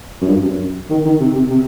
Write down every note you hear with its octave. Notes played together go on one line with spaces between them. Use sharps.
F#2
G2
F#2
D#3
D#3
C3
C3
C3